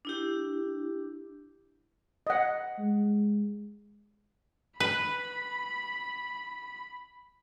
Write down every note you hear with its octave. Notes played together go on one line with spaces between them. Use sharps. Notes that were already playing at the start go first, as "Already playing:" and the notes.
D4 E4 G4
D#5 F#5
G#3
B4 B5